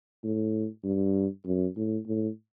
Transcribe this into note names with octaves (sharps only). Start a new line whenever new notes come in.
A2
G2
F#2
A2
A2